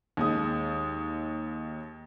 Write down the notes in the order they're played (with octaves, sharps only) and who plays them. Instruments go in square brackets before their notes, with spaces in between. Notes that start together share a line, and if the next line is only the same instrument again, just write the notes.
[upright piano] D#2 G#3 D#6